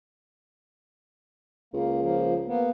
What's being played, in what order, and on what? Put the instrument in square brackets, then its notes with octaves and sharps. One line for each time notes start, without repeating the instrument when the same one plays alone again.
[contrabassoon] C#2 [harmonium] A#3
[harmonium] F3 A#3
A#3 B3